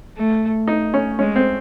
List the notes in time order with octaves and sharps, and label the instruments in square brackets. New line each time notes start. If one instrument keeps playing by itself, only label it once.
[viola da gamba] A3
[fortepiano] D#4
C#4
[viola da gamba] G#3 [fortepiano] C#4
[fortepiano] C4